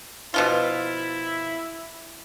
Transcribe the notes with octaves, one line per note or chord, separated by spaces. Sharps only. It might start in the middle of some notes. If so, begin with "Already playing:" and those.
B2 F3 E4 F4